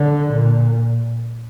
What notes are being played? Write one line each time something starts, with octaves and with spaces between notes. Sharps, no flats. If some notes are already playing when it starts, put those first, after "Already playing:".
Already playing: D3
A#2